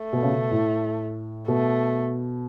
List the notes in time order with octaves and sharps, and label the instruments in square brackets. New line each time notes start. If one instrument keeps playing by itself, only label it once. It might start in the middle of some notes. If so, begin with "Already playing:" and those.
Already playing: [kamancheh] A3
[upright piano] B2
C#3
B2
A2
[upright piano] B2 [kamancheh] A3